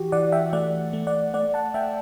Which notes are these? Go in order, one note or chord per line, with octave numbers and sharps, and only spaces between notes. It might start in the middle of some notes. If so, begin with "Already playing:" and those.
Already playing: E3 F#4 G4
E3 D5 F#5
E5 G5
A3 D5 F#5
A3
D5 F#5
A3 D5 F#5
F#5 A5
A3 E5 G5